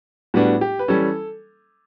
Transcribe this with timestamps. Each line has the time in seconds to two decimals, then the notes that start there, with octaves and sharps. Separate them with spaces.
0.34 A2 G3 B3 D4 F#4
0.61 G4
0.79 B4
0.88 E3 G3 C#4 A4